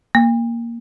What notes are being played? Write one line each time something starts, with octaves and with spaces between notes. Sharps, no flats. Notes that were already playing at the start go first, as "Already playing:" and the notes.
A#3